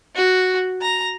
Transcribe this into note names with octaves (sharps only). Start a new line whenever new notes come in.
F#4
A#5